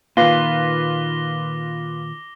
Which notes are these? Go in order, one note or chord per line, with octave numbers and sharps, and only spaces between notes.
A#2 D#3 F4 B4 F5 D6 A#6 G7